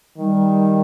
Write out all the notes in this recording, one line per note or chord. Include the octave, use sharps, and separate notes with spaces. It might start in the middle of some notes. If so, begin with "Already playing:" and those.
D#3 G3